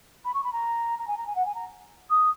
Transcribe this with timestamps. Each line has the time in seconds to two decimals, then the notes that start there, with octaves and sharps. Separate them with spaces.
0.24 B5
0.34 C#6
0.43 B5
0.52 A#5
0.98 A#5
1.07 G#5
1.17 A#5
1.27 G#5
1.35 F#5
1.45 G#5
1.54 A#5
2.10 D#6